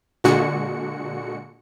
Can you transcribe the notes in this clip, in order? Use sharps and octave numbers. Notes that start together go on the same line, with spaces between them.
A#2 D3 G#3 F#4 C#7